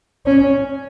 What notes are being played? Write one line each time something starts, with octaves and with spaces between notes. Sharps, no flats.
C#4